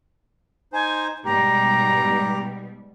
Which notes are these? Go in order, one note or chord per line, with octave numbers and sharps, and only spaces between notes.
D#4 C5 G#5
G#2 B2 G3 G4 A#5